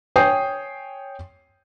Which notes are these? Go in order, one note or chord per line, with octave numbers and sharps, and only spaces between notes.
C#5 G5 G#5 D#6 G6 C7